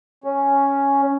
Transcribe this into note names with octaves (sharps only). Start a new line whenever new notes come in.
C#4